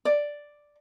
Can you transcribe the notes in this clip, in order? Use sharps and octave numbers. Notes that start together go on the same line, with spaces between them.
D5